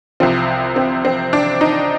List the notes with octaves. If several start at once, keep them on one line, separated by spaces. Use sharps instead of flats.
C2 C3 F3 C4
C4
C4
D4
D#4